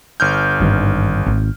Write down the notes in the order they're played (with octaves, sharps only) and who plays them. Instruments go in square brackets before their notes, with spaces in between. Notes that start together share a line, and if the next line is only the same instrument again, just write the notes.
[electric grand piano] G1 F6 G6
[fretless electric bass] G#1 G2 D#3
G#1